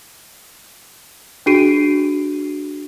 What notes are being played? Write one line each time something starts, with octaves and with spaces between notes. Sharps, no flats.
D4 F#4 G#4 C7 D7 D#7